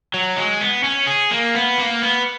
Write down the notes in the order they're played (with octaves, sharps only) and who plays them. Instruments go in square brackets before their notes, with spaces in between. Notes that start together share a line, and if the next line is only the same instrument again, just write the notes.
[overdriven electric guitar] F#3
G#3
B3
C#4
G#4
A#3
B3
A#3
B3